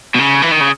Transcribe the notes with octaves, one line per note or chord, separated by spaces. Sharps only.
B2
C#3
E3
D#3
C#3